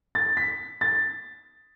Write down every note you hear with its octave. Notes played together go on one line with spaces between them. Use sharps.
A6
B6
A6